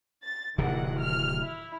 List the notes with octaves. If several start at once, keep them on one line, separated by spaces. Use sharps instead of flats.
A6
D1 C3 D#3 E3 F#5
F6
E4